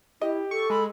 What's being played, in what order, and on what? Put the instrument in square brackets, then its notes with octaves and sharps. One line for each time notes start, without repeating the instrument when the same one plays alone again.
[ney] E4 [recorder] G4 [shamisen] D#5
[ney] A4 [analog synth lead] C#6
[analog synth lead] G#3 [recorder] B5